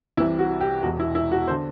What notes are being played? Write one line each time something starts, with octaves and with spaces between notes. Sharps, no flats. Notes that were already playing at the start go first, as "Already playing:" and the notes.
C2 C3 E3 E4
F#4
G4
E1 E2 B2 F#4
E4
E4
F#4
D3 C5